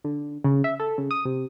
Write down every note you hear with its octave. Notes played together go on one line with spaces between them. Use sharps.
D3
C#3
E5
A4
C#3
D#6
C3